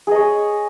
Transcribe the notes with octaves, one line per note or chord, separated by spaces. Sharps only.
G#4 C#5 D#5